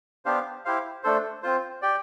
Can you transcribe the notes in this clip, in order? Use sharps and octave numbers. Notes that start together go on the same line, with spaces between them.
B3 D4 G4 C5 F5
E4 G4 C5 F5
A3 D4 A4 C5
C4 F4 C5
G4 D5 G5